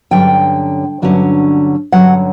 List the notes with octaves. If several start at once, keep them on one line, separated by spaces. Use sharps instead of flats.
G2 D3 F#3 C#4 G5
G2 D3 F#3 C#4
G2 D3 F#3 C#4 F#5